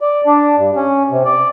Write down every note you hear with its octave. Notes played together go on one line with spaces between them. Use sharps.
D5
D4
G2
C#4
C3
D5